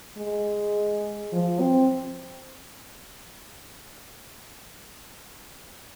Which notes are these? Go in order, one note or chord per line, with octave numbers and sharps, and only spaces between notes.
G#3
F3
C4